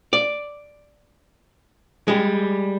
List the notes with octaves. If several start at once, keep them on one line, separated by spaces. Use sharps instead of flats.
D5
G3 G#3